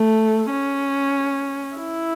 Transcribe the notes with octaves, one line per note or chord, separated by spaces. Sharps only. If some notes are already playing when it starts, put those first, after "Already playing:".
Already playing: A3
C#4
E4